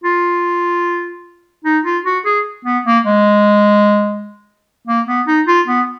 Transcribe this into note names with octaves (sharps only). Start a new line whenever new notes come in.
F4
D#4
F4
F#4
G#4
B3
A#3
G#3
A#3
B3
D#4
F4
B3